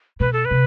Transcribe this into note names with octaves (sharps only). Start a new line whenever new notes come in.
B2 B4
A4
B4
C3